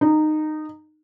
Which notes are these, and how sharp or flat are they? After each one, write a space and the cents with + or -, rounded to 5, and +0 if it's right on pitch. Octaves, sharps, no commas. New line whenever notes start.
D#4 -15